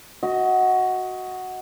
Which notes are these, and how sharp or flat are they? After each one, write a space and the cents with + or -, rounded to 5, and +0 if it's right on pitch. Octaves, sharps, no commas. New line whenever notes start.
F#4 +0 D#5 +25